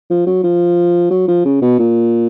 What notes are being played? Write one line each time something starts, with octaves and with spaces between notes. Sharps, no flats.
F3
F#3
F3
F#3
F3
C#3
B2
A#2